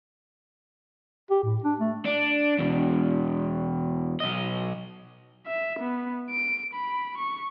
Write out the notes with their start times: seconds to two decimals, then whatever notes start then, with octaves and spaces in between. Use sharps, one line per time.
1.30 G4
1.44 A2
1.64 D4
1.80 A3
2.05 D4
2.58 E2 B2
4.20 B1 D#5
5.47 E5
5.79 B3
6.30 D7
6.74 B5
7.18 C#6